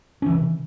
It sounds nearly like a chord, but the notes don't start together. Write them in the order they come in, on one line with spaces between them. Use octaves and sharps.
C#4 E3 D#3 C3